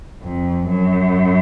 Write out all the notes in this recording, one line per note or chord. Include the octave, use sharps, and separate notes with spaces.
F2
F#2